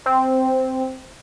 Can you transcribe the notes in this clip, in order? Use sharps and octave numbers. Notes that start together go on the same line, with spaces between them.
C4